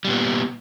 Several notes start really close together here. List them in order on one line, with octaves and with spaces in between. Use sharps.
G3 A#2 B3